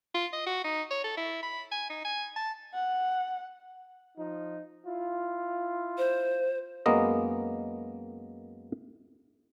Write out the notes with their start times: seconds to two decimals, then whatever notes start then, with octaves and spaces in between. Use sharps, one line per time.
0.15 F4
0.33 D#5
0.47 F#4
0.65 D#4
0.91 C#5
1.04 A4
1.18 E4
1.43 B5
1.72 G#5
1.90 D#4
2.05 G#5
2.36 A5
2.73 F#5
4.17 F3 D#4
4.86 E4 F4
5.98 C5
6.86 F#2 G#3 A#3 B3 D#5